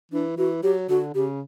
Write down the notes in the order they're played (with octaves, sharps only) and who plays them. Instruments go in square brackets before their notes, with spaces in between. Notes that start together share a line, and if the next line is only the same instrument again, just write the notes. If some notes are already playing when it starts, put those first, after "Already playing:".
[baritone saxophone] E3 [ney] D4
[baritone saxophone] E3 [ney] F#4
[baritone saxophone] F#3 [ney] G4
[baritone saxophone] D3 [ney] F#4
[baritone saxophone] C#3 [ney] G4